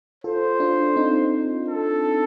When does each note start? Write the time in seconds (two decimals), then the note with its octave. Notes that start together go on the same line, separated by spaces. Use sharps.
0.24 F4 A4 C5
0.60 D4 F4
0.96 C4 D#4
1.69 A4